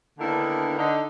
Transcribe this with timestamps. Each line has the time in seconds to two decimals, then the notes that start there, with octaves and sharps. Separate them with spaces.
0.19 D3 D#3 A#3 B3 D4 E4
0.77 D3 D#4